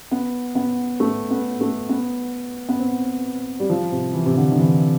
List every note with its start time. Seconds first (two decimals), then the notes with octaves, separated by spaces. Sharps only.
0.11 B3
0.55 B3
1.00 A3
1.31 B3
1.61 A3
1.89 B3
2.69 B3
2.80 C4
3.60 G3
3.69 F3
3.92 C3
4.13 E3
4.25 C3
4.36 D3
4.52 D3
4.58 E3